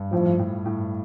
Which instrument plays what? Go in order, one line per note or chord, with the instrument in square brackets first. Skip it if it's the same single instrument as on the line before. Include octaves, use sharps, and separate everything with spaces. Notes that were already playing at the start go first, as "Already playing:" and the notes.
Already playing: [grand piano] G2
[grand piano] A2 [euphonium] F3
[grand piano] A2
A2